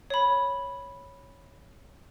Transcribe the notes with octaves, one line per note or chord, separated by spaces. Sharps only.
C#5 B5